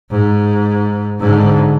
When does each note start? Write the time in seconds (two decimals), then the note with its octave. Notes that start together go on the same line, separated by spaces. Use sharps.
0.11 G#2
1.20 G#2 D3